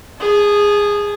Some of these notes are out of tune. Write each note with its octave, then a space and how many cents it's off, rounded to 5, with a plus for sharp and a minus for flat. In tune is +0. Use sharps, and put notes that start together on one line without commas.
G#4 -15 A5 -45